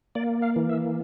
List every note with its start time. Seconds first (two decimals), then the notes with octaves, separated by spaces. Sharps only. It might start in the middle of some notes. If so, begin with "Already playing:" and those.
0.15 A#3 D5
0.42 F5
0.56 E3
0.69 E5